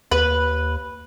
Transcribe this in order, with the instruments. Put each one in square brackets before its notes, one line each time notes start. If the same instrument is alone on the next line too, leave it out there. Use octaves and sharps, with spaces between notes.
[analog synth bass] D#2 [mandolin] B4